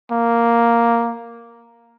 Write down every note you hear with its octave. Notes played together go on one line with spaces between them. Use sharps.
A#3